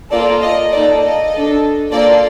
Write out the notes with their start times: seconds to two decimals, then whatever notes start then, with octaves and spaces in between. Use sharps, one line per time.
0.12 A#3 F4 A4 D5
0.42 D#5
0.72 A#3 D#4 A4 D5
1.02 D#5
1.32 D4 A4
1.92 A#3 F4 A4 D5